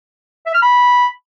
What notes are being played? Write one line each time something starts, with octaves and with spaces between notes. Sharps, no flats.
E5
F6
B5